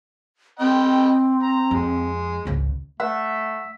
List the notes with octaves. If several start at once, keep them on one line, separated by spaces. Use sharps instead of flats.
C4 D#5 G5 B5
A#5
F2 G#3
G#1 C#2
A3 E5 F#5